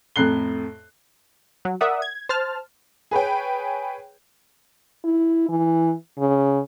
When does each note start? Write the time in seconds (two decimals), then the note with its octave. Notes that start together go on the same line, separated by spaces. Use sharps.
0.16 F2 A2 A#5 F#6 C7 G7
1.65 F#3
1.81 A#4 D5 E5 F#5 D#6
2.02 G#6
2.29 C5 A5 F6
3.11 G#4 B4 C#5 G5
5.04 E4
5.49 E3
6.19 C#3